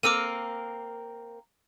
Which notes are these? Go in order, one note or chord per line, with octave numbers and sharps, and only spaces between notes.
A#3 C4 A#4 D6 E6 D#7